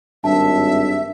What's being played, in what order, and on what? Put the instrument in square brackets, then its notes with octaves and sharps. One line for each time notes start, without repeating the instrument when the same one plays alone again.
[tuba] G#1 [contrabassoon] G2 [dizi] E5 [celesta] A5